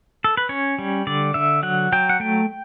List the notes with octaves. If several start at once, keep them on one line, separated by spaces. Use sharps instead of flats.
A4
B4
C#4 C#5
G3
D3 D5
D3 E5
F#3 F#5
F#3 G5
F#5
A3 G5